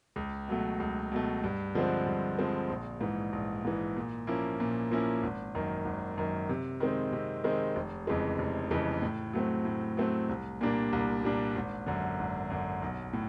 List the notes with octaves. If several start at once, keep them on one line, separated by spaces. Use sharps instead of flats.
C#2
B2 F#3 A3
C#2
B2 F#3 A3
G2
D3 F3 G#3 C4
G2
D3 F3 G#3 C4
A#1
G#2 E3
A#1
G#2 E3
A#2
F3 A#3 C#4 E4
A#2
F3 A#3 C#4 E4
G#1
F#2 D#3
G#1
F#2 D#3
C3
D#3 G#3 C4
C3
D#3 G#3 C4
F1
F2 C#3 E3 G#3
F1
F2 C#3 E3 G#3
A2
F#3 A3 C4
A2
F#3 A3 C4
C2
A#2 G3 A#3 D4
C2
A#2 G3 A#3 D4
G#1
F#2 D3
G#1
F#2 D3
B1
A2